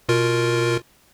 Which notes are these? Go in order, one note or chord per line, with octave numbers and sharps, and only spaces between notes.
B2 F4 A#4